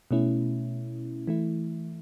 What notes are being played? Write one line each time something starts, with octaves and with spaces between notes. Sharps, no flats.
B2 A3 C#4 E4
E3 A3 E4